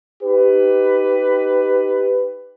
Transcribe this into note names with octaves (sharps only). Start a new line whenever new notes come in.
D#4 G4 B4